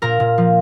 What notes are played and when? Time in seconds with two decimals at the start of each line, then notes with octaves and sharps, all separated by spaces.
0.02 A#2 A#4 A#5
0.20 A#2
0.38 F3